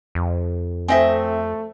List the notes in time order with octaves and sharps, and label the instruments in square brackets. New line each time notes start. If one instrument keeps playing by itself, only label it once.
[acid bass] F2
[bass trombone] A3 [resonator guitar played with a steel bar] C4 D#5 E5 [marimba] C5 G#5